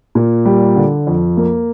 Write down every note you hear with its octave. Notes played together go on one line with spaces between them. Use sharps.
A#2
G3
D3
F2
A#3